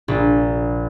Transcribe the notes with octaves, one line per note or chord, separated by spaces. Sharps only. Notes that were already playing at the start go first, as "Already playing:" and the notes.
A#1